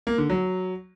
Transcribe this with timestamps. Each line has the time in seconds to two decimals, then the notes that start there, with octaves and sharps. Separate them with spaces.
0.07 A#3
0.18 D3
0.30 F#3